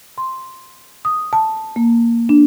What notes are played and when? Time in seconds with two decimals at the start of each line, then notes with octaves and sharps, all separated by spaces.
0.18 C6
1.05 D#6
1.33 A5
1.76 A#3
2.29 D4